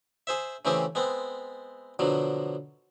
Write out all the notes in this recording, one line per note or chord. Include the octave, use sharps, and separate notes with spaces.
G#4 C5 E5
C#3 E3 A3 C4 G4 G#4
G#3 B3 C4
B2 D3 F3 F#3